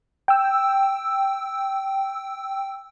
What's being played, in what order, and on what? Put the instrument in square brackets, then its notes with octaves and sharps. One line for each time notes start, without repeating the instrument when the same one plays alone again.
[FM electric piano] G5 E6